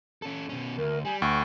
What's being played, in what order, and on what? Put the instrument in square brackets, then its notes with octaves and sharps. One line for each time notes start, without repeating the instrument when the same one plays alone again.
[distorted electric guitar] C#4 A4
B2 C#4
[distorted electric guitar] D2 [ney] A#4
[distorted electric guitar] G3 [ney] G#5
[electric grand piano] D2 [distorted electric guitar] G5 [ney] C#6